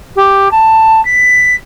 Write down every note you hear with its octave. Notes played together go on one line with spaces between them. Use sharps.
G4
A5
B6